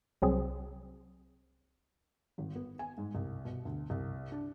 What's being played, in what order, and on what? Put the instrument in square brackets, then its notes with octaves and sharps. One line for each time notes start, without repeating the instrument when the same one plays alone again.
[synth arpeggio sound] C2 F#3 C4 G#4
[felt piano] G#1
B3
G#5
G#2
C2
B2
D2
C2
D4